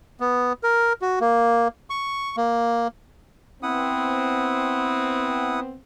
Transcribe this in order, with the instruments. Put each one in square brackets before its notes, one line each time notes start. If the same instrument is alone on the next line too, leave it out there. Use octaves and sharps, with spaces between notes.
[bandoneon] B3
A#4
F#4
A#3
C#6
A#3
[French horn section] B3 C4 [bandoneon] E4 F#5 D#6